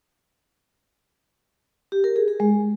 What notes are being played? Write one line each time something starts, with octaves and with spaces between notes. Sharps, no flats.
G4
A#4
G#4
G#4
G#3